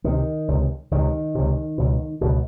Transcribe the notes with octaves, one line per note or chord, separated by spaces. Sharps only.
C#2 C3 D#3
C#2 C3
C#2 C3 D#3
C#2 C3
C#2 B2
C#2 B2